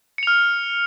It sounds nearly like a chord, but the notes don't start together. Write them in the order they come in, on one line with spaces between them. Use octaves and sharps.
C#7 F7 F6